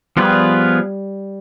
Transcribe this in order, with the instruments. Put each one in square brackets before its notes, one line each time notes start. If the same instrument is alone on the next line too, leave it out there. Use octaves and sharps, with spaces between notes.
[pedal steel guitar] F3 B3 F4 G#4 B4 [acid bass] G3